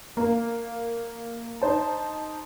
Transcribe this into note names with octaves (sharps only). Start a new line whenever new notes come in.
A#3
D#4 C5 A5